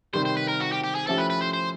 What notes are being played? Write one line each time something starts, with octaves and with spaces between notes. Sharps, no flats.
C3 D#3 G3 C5
C5
B4
A#4
F#4
G4
G4
G#4
F3 A3 C#4 E4 G4 A4
B4
B4
C5
C5